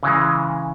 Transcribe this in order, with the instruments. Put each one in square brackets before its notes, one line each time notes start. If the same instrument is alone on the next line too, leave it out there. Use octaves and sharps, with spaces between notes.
[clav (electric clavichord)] C#3 E3 G#3